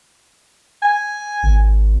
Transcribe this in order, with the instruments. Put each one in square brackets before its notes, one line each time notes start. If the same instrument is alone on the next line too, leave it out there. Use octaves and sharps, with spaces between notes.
[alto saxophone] G#5
[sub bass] G#1